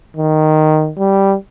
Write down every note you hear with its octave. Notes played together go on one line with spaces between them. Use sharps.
D#3
G3